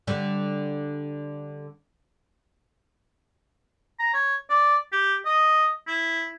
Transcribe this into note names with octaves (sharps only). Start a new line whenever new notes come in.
D3 G3
A#5
C#5
D5
G4
D#5
E4